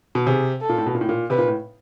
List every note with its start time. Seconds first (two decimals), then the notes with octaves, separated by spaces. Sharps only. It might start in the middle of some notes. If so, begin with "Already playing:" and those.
0.15 B2
0.26 C3 G#4
0.61 A4
0.69 A#2
0.78 A2
0.86 B2
0.95 A#2
1.01 A2
1.09 A#2
1.30 C3 B4
1.38 A#2
1.48 A2